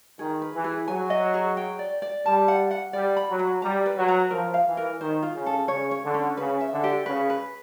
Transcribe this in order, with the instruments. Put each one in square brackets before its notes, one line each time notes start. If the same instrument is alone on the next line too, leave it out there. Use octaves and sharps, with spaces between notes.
[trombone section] D#3 [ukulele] G#4
[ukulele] B4
[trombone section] E3
[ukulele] G#4
[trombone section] F#3 [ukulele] G#5
[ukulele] D#5
G#4
G5
D5
D5
[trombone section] G3 [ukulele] A5
[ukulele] F#5
F#5
[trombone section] G3 [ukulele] D5
[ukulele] B5
[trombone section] F#3
[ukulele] B5
[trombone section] G3 [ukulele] A#5
[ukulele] B4
[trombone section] F#3
[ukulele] A#5
[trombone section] F3 [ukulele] A#4
[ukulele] F5
[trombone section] E3
[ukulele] A#4
[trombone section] D#3 [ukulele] C5
[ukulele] F4
[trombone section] C#3
[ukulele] A4
[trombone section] C#3 [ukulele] C#5
[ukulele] C#5
[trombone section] D3
[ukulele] C#4
[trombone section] C#3 [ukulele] B4
[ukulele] E5
[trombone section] D3
[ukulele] G4
[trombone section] C#3 [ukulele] B4
[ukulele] B4